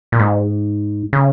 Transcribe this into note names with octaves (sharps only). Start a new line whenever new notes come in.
A#2
G#2
C#3